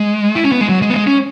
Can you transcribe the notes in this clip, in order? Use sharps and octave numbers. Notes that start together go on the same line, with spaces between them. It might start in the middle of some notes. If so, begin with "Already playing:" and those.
Already playing: G#3
E4
C#4
B3
G#3
F#3
G#3
B3
G#3
C#4